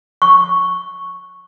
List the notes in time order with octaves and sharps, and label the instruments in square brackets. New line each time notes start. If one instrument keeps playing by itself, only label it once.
[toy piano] C#6